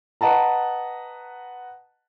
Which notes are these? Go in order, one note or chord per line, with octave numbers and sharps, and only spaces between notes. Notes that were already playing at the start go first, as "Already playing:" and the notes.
B4 D#5 F#5 A5 A#5